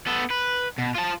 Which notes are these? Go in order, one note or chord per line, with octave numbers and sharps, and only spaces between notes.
B3 A4
B4
B2
F4 A5